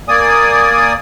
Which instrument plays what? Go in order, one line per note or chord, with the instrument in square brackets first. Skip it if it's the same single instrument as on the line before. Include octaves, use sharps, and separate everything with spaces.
[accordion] A#3 D5 G#5 D#6